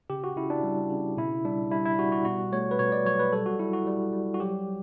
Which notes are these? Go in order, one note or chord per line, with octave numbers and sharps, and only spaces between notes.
C#3 G4
F#4
C#3 E4
D4
G3
C#3
B2 E4
G3 D4
G3 E4
E4
G3 F#4
F#4
B2 F#4
A3 C#5
B4
B2 C#5
D5
F#3 C#5
B4
G3 A4
F#4
G3 E4
F#4
G3
G3
F#4
F#3 G4